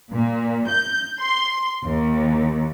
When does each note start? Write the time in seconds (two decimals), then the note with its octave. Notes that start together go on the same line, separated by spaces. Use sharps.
0.14 A#2
0.70 G6
1.21 C6
1.85 D#2